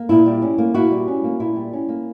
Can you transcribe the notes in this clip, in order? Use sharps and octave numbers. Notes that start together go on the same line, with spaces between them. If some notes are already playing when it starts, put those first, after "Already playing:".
Already playing: A#3
A#2 E4
G3
C#4
A#3
A#2 E4 F#4
G3
C#4
A#3
A#2 E4
G3
C#4
A#3